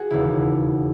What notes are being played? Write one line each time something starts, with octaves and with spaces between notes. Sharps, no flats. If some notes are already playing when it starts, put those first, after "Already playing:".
Already playing: F#4 G#4
E1 D#2 C#3 E4